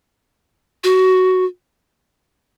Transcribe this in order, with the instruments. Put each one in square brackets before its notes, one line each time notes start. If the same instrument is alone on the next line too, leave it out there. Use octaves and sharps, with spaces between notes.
[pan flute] F#4